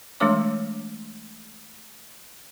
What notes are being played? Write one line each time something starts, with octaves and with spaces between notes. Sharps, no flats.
E3 G#3 A3 D4 C#5 D6